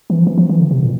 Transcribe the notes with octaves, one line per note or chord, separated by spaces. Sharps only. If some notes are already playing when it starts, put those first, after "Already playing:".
E3
F3
E3
F3
E3
D3
C3
A#2